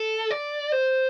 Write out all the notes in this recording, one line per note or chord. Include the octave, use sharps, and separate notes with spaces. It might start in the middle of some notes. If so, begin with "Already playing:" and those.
Already playing: A4
D5
C5